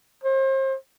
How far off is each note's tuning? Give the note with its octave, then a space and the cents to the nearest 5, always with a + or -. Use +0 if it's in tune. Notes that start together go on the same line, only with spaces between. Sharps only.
C5 +35